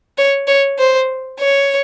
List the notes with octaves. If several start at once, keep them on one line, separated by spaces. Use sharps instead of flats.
C#5
C#5
C5
C#5